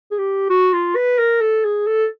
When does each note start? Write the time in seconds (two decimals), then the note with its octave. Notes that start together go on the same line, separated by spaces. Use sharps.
0.11 G#4
0.18 G4
0.50 F#4
0.73 F4
0.95 B4
1.18 A#4
1.41 A4
1.64 G#4
1.87 A4